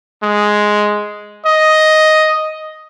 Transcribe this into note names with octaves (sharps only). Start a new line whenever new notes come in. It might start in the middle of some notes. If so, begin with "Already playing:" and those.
G#3
D#5